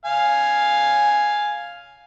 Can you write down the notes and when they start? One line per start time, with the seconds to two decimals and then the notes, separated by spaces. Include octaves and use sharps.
0.05 F5 G#5